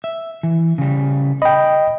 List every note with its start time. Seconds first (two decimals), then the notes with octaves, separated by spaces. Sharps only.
0.04 E5
0.43 E3
0.78 C#3 G3
1.42 D#5 G5 B5